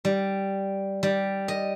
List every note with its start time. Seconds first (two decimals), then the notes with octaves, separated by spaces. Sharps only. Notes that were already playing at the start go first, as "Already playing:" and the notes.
0.05 G3
1.03 G3
1.48 D#5